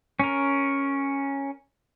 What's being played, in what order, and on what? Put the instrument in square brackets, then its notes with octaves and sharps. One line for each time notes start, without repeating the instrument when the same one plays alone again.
[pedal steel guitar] C#4 A#4